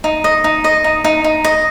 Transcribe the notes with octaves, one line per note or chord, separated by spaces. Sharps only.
D#4
D#5
D#4
D#5
D#4
D#4
D#4
D#5